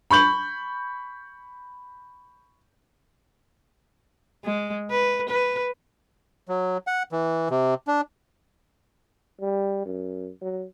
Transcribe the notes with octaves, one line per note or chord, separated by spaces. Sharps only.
B5 C#6 G6 F#7
G#3
B4
B4
F#3
F#5
E3
C3
D4
G3
F#2
F#3